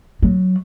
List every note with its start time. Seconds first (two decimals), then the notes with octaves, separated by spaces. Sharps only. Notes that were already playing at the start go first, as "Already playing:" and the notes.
0.23 F#3